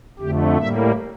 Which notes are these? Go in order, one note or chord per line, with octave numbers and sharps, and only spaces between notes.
F2 D3 A3 G4
A2 G3 A#3 E5